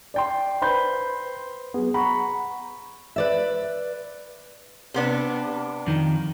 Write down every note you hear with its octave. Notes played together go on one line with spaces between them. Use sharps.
D5 G5 C6
B4 C5 B5 C6 G6
F#3 B3 G#4
F#5 A#5 B5 C#6
B4 D5 E5
C3 B3 D4
F2 D#3